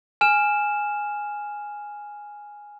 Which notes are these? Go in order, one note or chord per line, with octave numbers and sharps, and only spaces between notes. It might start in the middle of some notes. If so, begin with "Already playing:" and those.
G#5 F6 E7